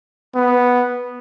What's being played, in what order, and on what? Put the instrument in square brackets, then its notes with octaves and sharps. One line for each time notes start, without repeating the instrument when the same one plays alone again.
[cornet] B3